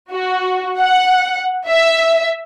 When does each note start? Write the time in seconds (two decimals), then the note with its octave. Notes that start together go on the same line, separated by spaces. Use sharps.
0.11 F#4
0.79 F#5
1.68 E5